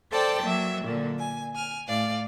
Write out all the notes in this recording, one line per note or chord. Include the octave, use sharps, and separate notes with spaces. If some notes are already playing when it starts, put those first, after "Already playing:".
A4 C5 D5 G5 A5
F#3 A#3 E5
A#2 D3 A#3
G#5
G#5 F6
A2 D5 F5